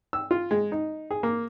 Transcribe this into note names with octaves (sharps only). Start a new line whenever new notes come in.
E6
F4
G#3
D#4
G#4
A#3